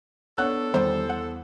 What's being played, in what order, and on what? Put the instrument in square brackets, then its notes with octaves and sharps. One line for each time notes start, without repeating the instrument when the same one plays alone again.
[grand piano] B3 D4 C#5 [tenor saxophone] A4 [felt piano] F#5 F#6
[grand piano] E2 [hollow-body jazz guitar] D#3 G3 [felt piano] C5
[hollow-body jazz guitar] F#5